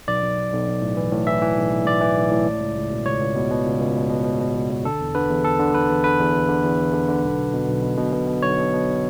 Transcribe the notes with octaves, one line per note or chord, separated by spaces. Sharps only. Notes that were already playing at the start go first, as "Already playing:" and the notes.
B1 D5
B1
B1
B1
B1
A2
E3
A2
E3 E5
E3
B1
B1
B1 D5
E3
B1
A2
C#2
C#2
C#2
B2
C#2 C#5
C#2
B2
B2
C#2
C#2
B2
B2
B2
B2
C#2
B2
D3 A4
E2
D3 B4
E2
E2 A4
D3
E2 B4
E2
D3 B4
E2
E2
D3
E2
E2
D3
D3
B1
B2
B2
B1
B2
B2
B2
B2
B1 C#5
B2
B2